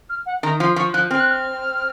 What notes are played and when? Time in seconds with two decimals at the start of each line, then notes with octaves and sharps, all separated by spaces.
0.10 F6
0.26 F#5
0.43 D#3 A#5
0.60 F3 C6
0.76 F3 C#6
0.94 F3 F#6
1.10 C4 F6
1.20 F#6
1.30 F6